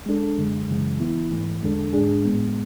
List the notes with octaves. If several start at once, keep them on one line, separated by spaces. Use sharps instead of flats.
G#3 D4 A4
F#2 D3 G#3
F#2 C#3 E3 G#3
E3 B3 E4
G#2 E3 A3
E2 D3 G#3 D4 A4
G#2 G#3 D4 G#4
A2 G#3 B3